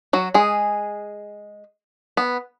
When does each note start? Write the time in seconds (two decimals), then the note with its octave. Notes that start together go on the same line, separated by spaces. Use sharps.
0.13 F#3 F#4
0.34 G#3 G#4
2.17 B3